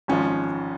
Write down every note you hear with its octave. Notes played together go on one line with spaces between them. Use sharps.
G#1 G#2 F3 C#4